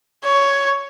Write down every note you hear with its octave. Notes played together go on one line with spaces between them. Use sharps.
C#5